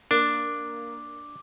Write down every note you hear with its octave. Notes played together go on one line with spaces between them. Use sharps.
A#3 D4 D6